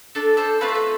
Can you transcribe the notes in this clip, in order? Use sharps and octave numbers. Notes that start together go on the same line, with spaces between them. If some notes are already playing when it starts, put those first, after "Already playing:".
D4 A4
A4 C5
A3 C4 F4 A4 B4
C5
B4